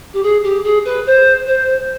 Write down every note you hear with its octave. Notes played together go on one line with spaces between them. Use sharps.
G4
G#4
G4
G#4
B4
C5
C5